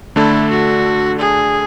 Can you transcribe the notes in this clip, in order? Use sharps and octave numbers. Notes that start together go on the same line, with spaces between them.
D3 A3 D4 E4 A4
F#4
G#4